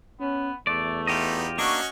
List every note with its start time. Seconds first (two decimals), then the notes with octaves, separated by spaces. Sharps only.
0.20 B3 C#4
0.67 E2 A3 D5
1.07 B3 D#4 F4 G4 D#5
1.58 A#3 C#4 D4 F#4 D#5 C#6